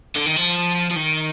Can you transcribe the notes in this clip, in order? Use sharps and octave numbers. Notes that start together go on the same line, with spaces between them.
D3
D#3
F3
F3
D#3